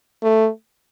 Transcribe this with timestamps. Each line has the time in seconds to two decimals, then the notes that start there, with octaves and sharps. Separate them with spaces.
0.23 A3